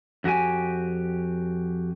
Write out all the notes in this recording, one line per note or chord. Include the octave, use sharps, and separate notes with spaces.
F2 F#4 G4 G#5